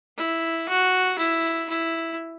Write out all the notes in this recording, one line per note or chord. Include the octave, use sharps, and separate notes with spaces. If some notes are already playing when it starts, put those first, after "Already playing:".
E4
F#4
E4
E4